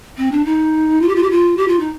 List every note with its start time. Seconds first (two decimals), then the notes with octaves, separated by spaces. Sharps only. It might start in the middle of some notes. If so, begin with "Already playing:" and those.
0.18 C4
0.32 D4
0.45 D#4
1.02 F4
1.08 G4
1.15 F4
1.23 G4
1.31 F4
1.57 G4
1.68 F4
1.80 D#4